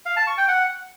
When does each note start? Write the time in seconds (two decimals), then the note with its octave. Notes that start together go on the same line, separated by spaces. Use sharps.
0.06 F5
0.16 A5
0.27 C#6
0.38 G5
0.48 F#5